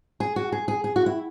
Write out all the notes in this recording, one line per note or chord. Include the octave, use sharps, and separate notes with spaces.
G#4
F#4
G#4
G#4
G#4
F#4
E4